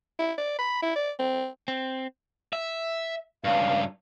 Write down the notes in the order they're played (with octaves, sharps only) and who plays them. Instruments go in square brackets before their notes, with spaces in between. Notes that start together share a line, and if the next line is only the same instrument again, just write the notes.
[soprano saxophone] E4
D5
B5
E4
D5
C4
[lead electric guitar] C4
[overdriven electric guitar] E5
[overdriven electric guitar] C#2 G2 [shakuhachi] F5